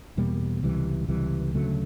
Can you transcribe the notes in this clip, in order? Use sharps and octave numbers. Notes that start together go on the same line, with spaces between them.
E2 B2 G3 A#3
C#2 C3 E3 G3
C#2 C3 E3 G3
D2 C#3 F#3 A3